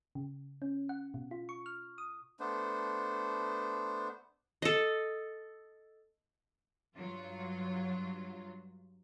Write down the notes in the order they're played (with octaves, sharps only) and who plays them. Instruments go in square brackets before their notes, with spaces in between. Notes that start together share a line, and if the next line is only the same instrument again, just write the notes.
[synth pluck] C#3
C#4
F#5
B2
F4
C#6
F6
D#6
[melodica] A3 B3 D4 C5
[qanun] A4 D#5
[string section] G2 F#3 F4